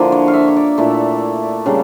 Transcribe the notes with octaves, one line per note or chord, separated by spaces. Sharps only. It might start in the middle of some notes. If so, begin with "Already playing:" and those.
Already playing: D3 F3 A#3 E4
C#5
F5
E5
C#5
D5
A#2 A3 E4
C#3 G3 A#3 D4